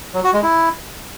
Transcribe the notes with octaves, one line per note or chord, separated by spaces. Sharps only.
F#3
F#4
G#3
E4